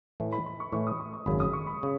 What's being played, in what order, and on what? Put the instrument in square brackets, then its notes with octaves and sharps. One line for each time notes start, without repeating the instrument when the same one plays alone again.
[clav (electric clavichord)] A2 E3 A3
[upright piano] B5
B5
C#6
[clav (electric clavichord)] A2 E3 A3 [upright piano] C#6
[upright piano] D#6
C#6
C#6
[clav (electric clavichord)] G#1 F#2 C#3 [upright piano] B5
[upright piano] D#6
C#6
B5
[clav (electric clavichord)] C#3